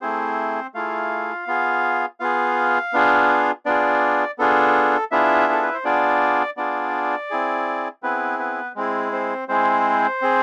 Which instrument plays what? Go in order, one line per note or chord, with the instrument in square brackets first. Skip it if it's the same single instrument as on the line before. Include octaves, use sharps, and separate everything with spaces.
[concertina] A3 C4 E4 G#4 C5
A3 E4 F4 G#4 F5
B3 F4 G#4
B3 F4 G#4 F5
B3 D4 F4 G#4
B3 D4 F4 G#4 D5
B3 D4 F4 G#4 A4
B3 D4 E4 F4 G#4 E5
A4
B4
C5
B3 D4 F4 G#4 D5
B3 D4 F4 G#4 D5
C4 E4 G#4
B3 C4 E4 G#4 B4
B3 B4
G#3 C4 E4 G#4
C4 C5
G#3 C4 E4 G#4 C5
C4 G#4